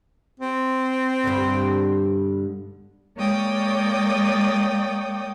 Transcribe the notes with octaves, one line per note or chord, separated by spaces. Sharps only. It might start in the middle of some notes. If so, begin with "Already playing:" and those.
C4
G2 B2 D3
G#3 A#3 C#5 D5 G5 D#6